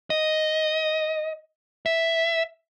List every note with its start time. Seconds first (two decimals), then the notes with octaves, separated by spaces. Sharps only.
0.10 D#5
1.86 E5